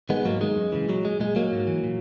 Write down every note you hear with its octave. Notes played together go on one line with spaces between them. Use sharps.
D#3 G#3 B3
G#2 F#3 A#3
D#3 G#3
F#2
C#3 E3
A#2 F#3
G#3
A#2 G#3
F#3 A#3
G#2
E3
A#2